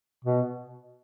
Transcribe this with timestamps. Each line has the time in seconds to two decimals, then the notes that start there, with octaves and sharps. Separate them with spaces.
0.25 B2